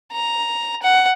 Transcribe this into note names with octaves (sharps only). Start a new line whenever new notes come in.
A#5
F#5